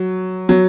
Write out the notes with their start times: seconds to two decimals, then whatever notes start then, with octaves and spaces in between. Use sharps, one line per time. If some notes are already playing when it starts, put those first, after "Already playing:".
Already playing: F#3
0.49 F#3